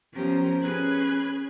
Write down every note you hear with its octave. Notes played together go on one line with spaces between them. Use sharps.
F3 B3 C#4 G4 A#4 C5
C#4 G#4 B4 F#6 G#6